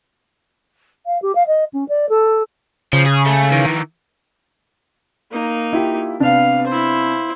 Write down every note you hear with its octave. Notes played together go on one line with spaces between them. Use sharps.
F5
G4
F5
D#5
C#4
D5
A4
C#3 F3
G#4
A3 A4
D#3 E3
A#3 D#4
E4 F4 G4
C3 B3 D4 F5
E4 C5